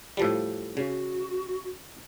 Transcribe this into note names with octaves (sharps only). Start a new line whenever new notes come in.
A2 F3 G3
C#3 F#4